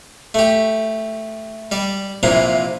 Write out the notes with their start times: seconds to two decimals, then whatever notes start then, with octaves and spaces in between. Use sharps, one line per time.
0.34 A3 G4
1.71 G3 D5
2.23 A#1 C3 E3 A#3 A#5